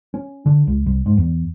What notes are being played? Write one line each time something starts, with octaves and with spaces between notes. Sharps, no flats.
C#4
D3
C#2
C2
G#2
E2